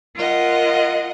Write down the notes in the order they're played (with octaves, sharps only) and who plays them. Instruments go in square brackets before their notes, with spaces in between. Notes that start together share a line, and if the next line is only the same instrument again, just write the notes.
[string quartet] F4 A#4 D#5 F#5